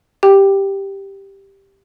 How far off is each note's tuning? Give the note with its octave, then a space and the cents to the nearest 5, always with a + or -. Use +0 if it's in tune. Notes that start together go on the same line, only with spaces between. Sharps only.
G4 +0 G5 +0